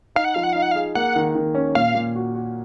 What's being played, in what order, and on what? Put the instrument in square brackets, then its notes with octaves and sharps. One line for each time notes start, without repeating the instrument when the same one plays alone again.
[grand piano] D#4 [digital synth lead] F5
[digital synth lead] F#5
[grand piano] F3 [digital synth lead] F5
[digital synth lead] F#5
[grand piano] D#4 [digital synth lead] F5
[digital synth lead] F#5
F5
[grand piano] G#4
[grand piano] A#3 [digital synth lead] F#5
[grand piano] D#3
D#3
C#4
[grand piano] A#2 [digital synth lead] F5
[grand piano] A#2
F#4
F#4